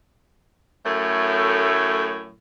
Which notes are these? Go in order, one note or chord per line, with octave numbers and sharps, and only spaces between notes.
F#2 A2 A3